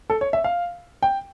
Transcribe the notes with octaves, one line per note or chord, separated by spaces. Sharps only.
A4
C#5
E5
F5
G5